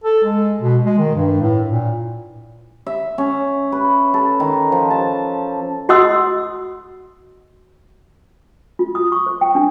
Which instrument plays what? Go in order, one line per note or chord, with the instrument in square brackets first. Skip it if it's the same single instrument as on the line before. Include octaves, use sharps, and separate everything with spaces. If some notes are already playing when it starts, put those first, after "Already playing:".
[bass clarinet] A4
G#3
B2
G#3
D#3
G2
A2
A#2
[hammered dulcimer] E5
C#4
B4
A4
D#3
F3
A5
[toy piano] F#4 D#5 F#5 C6 D#6 E6
F4
D#6
C#6
C5
G5
D4